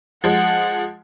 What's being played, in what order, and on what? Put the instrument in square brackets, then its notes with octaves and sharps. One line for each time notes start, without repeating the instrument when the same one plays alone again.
[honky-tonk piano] F3 G#3 [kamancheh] F#5